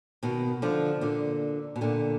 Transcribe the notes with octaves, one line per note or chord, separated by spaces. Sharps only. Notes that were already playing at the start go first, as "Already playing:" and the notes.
B2 D#3
D3 F3
A#2 D3
B2
A#2 D3